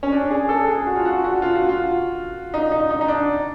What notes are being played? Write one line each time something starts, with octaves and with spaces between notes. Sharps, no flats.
C#4
D4
G#4
A4
G#4
F#4
F4
F#4
F#4
F4
F#4
F4
D#4
D#4
D#4
D#4
D4